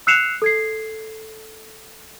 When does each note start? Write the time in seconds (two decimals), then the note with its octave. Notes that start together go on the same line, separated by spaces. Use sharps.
0.07 E6 F#6 C7 C#7 E7 F7
0.42 A4 G#6 C7